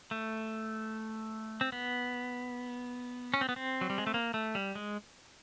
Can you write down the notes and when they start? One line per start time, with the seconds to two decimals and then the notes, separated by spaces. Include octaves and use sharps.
0.11 A3
1.61 C4
1.72 B3
3.34 C#4
3.41 C4
3.49 B3
3.56 C4
3.81 F#3
3.90 G3
3.98 G#3
4.07 A3
4.14 A#3
4.34 A3
4.55 G3
4.75 G#3